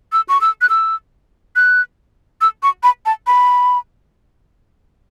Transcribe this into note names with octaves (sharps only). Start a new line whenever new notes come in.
E6
C#6
E6
F#6
E6
F#6
E6
C#6
B5
A5
B5